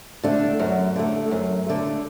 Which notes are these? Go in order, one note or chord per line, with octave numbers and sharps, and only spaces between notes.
D3 A3 D4
F#2
D3 A3
F#2
D3 A3